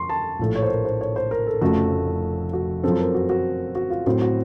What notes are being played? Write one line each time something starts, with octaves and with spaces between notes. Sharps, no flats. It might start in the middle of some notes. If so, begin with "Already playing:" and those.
Already playing: F2 C6 C#6
A5
A#1 A2 A3
C#5
C5
A#4
C5
C#5
C5
A#4
A4
F1 F2 C#3 A3 C#4 F#4
F#4
F#2 F3 C4 A4
A#4
F#4
F#4
F#4
F4
A2 F#3 C4 F#4
F#4